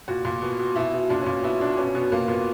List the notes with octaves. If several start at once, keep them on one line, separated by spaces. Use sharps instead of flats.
A#2 F#4
A#2
B2
B2
B2 E4
B2
A#2 D4
C#4
A#2
B2 E4
B2 D4
B2 C#4
B2 B3
A#2 A#3
A#2 B3